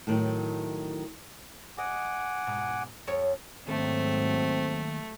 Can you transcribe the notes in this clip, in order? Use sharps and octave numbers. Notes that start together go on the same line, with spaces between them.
A2 D#3 F#3
D#5 F#5 G#5 D6
G#2 B2
F2 C#5
D#2 G#2 F#3 A3 C4 A4